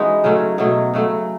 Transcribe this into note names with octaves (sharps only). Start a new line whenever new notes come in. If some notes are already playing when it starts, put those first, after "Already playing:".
Already playing: E3 G#3 C#4 D#4 F#4
C#3 F#3 A3 C#4
B2 F#3 A3
C#3 F#3 A3